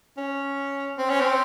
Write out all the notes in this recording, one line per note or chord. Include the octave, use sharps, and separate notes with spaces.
C#4
C4
C#4
C4